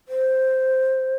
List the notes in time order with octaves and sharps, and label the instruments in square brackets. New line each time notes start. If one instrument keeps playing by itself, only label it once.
[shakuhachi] C5